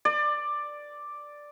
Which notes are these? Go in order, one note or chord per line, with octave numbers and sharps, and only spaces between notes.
D5